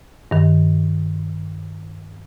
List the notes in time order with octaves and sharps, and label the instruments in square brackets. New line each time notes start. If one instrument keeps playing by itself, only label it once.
[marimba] G2 D#3